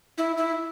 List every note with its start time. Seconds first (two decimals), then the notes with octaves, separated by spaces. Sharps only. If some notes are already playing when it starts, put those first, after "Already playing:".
0.18 E4
0.37 E4